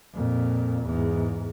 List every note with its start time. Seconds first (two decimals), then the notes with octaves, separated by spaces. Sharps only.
0.14 F2 A#2
0.86 E2 G#2